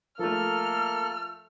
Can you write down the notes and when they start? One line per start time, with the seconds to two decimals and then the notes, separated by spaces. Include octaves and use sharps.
0.19 F3 A3 A#3 A4 F6